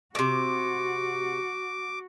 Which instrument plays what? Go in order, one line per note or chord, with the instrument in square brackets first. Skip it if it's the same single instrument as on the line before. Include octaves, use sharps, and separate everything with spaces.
[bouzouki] A2 C3 [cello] F#4 [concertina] D6